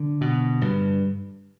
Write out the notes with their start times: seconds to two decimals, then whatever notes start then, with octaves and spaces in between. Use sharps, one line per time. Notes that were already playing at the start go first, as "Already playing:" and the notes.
Already playing: D3
0.21 B2
0.61 G2